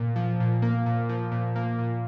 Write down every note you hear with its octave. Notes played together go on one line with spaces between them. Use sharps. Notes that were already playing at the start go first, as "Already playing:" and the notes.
Already playing: A#2
F3
A#2
A#3
A#2
F3
A#2
A#3
A#2